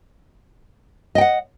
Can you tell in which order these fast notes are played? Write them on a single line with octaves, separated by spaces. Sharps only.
D#5 G5 F#5